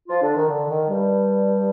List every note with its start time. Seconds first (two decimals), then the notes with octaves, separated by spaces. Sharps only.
0.08 F3 F4
0.22 D3 D4
0.36 D#3
0.49 D3
0.69 D#3
0.88 G2 G3